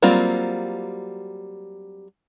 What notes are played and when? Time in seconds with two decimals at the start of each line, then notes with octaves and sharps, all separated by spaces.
0.02 F#3 G3 A#3 C4 F4